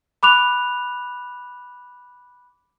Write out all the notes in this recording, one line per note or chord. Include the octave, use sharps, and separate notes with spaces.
B5 D6 F#6 F7